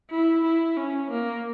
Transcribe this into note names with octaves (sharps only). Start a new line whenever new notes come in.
E4
E4
C#4
A#3